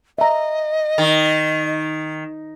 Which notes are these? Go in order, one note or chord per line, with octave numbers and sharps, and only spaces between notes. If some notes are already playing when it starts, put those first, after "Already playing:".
D#5 E5 A#5
D#3